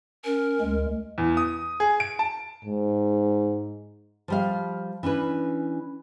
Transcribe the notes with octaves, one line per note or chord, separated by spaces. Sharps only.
C#4 A#4
D2 G#3
E2
D#6
G#4
D7
A5
G#2
F3 G3 F5
E3 C#4 D4 B4